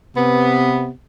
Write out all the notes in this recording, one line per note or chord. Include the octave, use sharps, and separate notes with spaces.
C3 B3